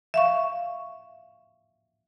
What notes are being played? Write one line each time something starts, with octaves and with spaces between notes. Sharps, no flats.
E5 F5 C#6